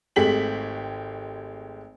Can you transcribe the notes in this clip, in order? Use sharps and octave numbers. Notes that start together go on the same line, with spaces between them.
G#1 G#3 A3 G4 B6 F#7